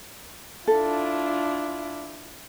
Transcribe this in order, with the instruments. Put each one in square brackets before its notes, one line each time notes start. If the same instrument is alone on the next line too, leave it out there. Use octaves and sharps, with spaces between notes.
[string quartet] D4 E4 F4 [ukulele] A4